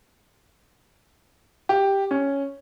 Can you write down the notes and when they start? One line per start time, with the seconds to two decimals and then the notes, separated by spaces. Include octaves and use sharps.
1.69 G4
2.11 C#4